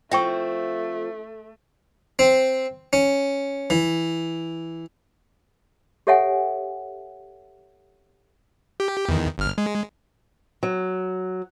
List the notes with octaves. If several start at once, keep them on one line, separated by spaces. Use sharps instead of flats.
F3 A3 C4 E5 G5 C#6
C4
C#4
E3
G4 A4 C#5 E5 F#5 G#5
G4
E2 D#3
G1 F6
G#3
F#3